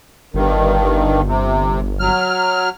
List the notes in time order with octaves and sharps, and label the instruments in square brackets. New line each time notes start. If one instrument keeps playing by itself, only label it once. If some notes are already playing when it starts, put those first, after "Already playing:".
[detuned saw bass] G1 [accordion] G2 D#3
[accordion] C3
F#3 F6